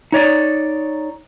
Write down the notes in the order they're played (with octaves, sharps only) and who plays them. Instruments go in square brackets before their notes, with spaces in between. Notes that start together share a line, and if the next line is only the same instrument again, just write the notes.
[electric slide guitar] D#4 C#5 D5